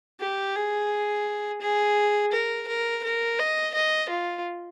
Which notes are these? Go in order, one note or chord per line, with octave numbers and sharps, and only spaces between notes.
G4
G#4
G#4
A#4
A#4
A#4
D#5
D#5
F4